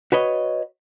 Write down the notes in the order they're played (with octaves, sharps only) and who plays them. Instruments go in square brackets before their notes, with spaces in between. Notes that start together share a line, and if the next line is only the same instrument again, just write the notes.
[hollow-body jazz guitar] F#4 B4 C#5 D#5